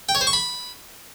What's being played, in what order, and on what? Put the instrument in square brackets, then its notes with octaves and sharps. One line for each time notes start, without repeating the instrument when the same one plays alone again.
[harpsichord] G5
C#5
C5
C#6
B5